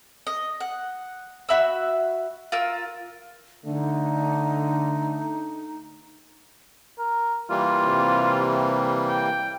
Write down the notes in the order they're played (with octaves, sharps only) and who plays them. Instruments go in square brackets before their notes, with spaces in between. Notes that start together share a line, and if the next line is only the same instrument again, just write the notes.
[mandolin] D#5
F#5
F#4 E5 B5 E6
F4 A#4 E6
[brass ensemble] D3 [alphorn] A3 [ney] D#4
[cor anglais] A#4
[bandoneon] E3 G3 A#3 [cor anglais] F4
[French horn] C3
[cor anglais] G5